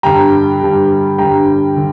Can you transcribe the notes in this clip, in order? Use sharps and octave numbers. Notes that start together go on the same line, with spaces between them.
G2 D3 G3 G5 A#5
G2 D3 G3
G2 D3 G3 G5 A#5
D3